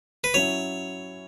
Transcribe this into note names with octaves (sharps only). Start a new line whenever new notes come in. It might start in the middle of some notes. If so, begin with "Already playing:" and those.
B4
F#3 C#4 E4 C#5